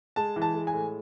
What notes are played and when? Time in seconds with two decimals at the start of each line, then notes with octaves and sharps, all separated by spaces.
0.16 G#3 A5
0.36 E3
0.42 A5
0.55 G#3
0.67 G#5
0.73 A2